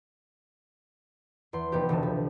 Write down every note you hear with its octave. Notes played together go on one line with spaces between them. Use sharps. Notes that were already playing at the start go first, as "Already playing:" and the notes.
E2 C6
F1 B3 G4
E1 D2 C3 A5
F3